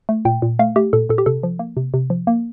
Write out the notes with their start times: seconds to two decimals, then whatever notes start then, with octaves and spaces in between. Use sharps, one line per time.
0.09 A3
0.25 A#2 G5
0.42 A#2
0.59 A3 F5
0.76 A3 G4
0.93 A#2 A4
1.09 A#2 A4
1.18 G4
1.26 C3 A4
1.43 F3
1.59 A#3
1.77 C3
1.94 C3
2.10 F3
2.27 A#3